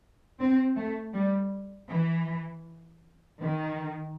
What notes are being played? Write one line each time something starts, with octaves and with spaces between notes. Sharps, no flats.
C4
A3
G3
E3
D#3